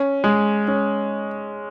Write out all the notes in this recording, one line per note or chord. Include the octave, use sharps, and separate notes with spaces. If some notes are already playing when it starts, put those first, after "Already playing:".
Already playing: C#4
G#3
C#4